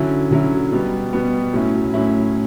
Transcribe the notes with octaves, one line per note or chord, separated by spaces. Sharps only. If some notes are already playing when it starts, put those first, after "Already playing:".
Already playing: D3 F#3 C#4 E4
D3 F#3 C#4 E4
B2 G3 B3
B2 G3 B3
A2 F#3 C#4 E4
A2 F#3 C#4 E4